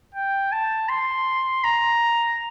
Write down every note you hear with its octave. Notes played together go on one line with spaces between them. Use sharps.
G5
A5
C6
A#5